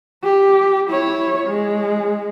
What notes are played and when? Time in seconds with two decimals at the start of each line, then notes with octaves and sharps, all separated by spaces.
0.24 G4
0.90 E4 C#5
1.47 G#3